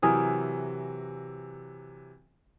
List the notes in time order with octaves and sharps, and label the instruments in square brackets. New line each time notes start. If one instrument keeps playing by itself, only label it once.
[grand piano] C3 E3 F#3 [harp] A#4 G#5 D#6